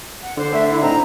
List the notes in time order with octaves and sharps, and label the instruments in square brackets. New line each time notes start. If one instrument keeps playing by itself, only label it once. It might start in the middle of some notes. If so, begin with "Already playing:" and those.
[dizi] F#5
[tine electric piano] D3 [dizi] C5
[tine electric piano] D3 A3 [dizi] E5
[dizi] E4
[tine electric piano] A2 C4 D#4 [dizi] A#5